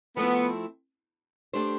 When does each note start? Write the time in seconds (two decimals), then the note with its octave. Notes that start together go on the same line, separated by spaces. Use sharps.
0.17 F3 A3 B3 C4 E4
1.53 A3 D4 G4 C5